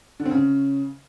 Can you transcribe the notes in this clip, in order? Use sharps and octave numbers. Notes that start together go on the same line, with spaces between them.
D3
C4
C#3